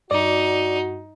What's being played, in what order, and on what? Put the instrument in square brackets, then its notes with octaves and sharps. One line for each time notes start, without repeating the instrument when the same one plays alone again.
[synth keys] G2 [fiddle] D#4 [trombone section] F#4 [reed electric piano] D5